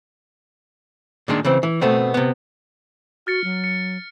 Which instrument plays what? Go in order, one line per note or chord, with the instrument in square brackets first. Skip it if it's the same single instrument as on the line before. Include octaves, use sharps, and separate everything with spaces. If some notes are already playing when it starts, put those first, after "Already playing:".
[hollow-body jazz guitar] A#2 D#3 G#3 D4
C#3 E3 C4
E3
B2 A3 B3 C4
C3 B3
[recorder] F#4 [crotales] F6 A6 C#7
[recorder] F#3
[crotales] C#7